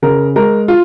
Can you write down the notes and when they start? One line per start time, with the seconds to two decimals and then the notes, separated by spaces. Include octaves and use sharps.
0.02 C#3 A#4
0.36 G#3 A#4
0.68 F4